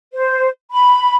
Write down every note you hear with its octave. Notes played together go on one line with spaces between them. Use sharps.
C5
B5